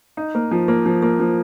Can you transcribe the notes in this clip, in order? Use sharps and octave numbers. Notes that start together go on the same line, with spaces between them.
D#4
A#3
F3
A#3
F3
A#3
F3